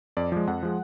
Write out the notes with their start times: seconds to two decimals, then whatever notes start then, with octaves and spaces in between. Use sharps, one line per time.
0.17 F2 D5
0.32 F3 G#3 D5
0.47 F2 F#5
0.63 F3 G#3